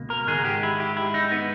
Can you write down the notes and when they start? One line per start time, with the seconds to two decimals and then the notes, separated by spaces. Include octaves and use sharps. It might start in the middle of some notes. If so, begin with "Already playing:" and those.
Already playing: C#2 B2 A#3
0.10 A#4
0.27 G#2 D#3 G#3 G#4
0.45 G4
0.63 E4
0.80 G4
0.97 E4
1.14 D#4
1.32 B3